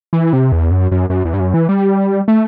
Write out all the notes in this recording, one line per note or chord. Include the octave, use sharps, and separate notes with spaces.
E3
C3
E2
F#2
F#2
F#2
E2
G2
F#2
E3
G3
A3